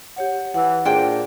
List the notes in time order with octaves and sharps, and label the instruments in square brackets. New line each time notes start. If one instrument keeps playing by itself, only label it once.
[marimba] G4 C#5 F#5
[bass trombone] E3 [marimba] F#5 E6
[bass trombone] A#2 [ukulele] D4 C5 G5 [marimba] G#4